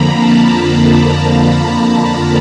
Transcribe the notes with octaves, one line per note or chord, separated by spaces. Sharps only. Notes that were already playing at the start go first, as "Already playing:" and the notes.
Already playing: F2 D3 F3 A#3 A#5 B5
A5
A#5